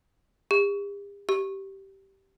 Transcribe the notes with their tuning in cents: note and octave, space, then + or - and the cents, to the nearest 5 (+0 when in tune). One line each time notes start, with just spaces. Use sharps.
G4 +45
G4 -15